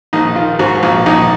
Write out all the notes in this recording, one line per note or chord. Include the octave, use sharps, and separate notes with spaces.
A#1 D#4
D#3 F4
G#2 F#4
A#1 F4
A#1 D#4